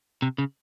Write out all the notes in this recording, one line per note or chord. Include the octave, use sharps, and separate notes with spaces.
C3
C#3